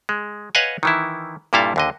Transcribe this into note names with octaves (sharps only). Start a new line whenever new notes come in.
G#3
B4 C#5 D#5 F5 F#5 G#5
D#3 E3 E4
G2 A#2 G3 E4 A4 F5
D#2 D3 D#5